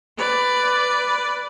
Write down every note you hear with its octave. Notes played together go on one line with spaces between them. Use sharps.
B4 D5